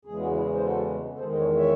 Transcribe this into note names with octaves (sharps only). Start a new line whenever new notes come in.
E2 C#3 E3 G#3 G#4
F#4
E4 G#4
C5
F#4 A4
A4
E2 D#3 G#3 G#4 C5
D#5
A4 C#5
C#5 E5